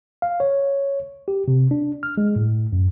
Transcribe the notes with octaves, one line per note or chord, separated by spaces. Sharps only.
F5
C#5
G4
C3
D4
F6
G#3
A2
F#2